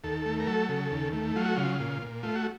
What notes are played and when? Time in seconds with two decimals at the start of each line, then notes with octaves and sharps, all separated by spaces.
0.04 D#2 A4
0.26 A3
0.40 A#4
0.47 F#3 A4
0.69 C#3
0.91 D#2
1.13 A3
1.36 F#3 F4
1.45 F#4
1.56 C#3 F4
1.80 A#2
2.02 A#2
2.23 A3 F4
2.35 F#4